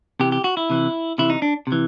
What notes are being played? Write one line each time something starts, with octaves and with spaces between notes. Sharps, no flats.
C3 E3 G4
G4
F#4
E4
C3 E3
C3 E3 E4
D#4
D4
C3
E3